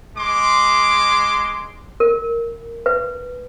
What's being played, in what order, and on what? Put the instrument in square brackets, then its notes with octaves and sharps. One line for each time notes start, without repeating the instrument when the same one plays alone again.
[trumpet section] G#3 C6 D6
[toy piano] A#4
B4